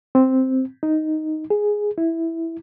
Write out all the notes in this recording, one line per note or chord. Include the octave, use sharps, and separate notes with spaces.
C4
D#4
G#4
E4